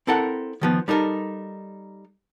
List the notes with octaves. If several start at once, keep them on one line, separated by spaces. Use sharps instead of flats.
C4 E4 A4 A#4 F#5
D#3 F3 B3
G3 D#4 A4 A#4